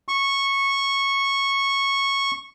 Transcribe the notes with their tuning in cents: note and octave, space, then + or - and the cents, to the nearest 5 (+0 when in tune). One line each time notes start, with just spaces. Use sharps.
C#6 -10